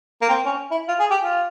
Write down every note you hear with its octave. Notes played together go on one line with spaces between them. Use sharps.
A#3
C4
C#4
E4
F4
G#4
G4
F4